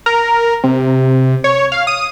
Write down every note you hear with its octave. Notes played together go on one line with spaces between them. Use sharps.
A#4
C3
C#5
F5
D#6